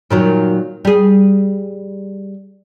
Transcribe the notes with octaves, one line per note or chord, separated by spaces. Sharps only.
A#2 D#3 F#3
G3 G#4